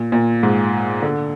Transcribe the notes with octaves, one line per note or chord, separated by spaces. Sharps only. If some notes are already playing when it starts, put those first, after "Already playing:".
Already playing: A#2
A#2
G#2
D3